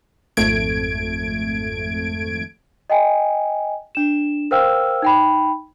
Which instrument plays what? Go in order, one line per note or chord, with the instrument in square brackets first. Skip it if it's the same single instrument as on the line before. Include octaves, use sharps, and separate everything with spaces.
[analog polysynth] G#1 F2 A3 G#6 D7
[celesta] D#5 G5 G#5
D4 E7
A#4 C5 F5 G5 E6 F6
D#4 G5 B5